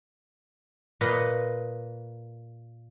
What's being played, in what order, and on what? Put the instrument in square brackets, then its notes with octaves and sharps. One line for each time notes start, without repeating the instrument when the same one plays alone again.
[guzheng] A#2 B4 D#5